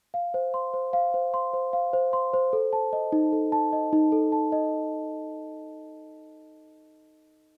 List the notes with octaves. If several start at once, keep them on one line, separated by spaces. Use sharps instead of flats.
F5
C5
C6
C5
F5
C5
C6
C5
F5
C5
C6
C5
A4
A5
D#5
D#4
A4
A5
D#5
D#4
A4
A5
D#5